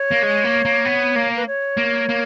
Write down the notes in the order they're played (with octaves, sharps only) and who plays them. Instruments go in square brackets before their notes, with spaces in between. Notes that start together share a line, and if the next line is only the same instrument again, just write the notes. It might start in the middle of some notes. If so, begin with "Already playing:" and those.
Already playing: [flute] C#5
[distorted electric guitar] A#3
G#3
A#3
A#3
B3
A#3
[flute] B4
C#5
[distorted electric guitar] A#3
A#3